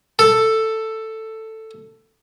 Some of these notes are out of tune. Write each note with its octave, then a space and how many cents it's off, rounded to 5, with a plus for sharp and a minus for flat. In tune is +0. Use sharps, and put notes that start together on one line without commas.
A4 +10